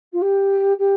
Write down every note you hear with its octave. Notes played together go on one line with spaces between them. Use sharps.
F4
G4
G4